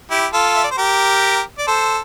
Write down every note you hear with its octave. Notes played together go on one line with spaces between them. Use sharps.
E4 G4
F4 A4
E5
D5
C5
G4 A#4
D5
A4 C5